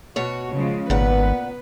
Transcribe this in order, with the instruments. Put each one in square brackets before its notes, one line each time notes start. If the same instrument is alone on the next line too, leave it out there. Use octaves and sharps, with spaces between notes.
[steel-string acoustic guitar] B2 C#5 [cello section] F#4
[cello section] C#3 F3 G#3
[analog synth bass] G#1 [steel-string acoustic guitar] A#2 F#5 [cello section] B3 B4